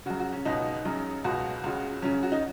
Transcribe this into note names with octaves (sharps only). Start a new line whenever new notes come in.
F#2 C#3 F#4
F#4
C#4
C#2 B2 D#4
F#2 C#3
C#2 B2 F#4
C#2 C#3
F#2 C#3 C#4
F#4
D#4